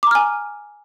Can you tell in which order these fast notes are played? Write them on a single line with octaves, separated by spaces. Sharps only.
D6 A#5 F6 G#5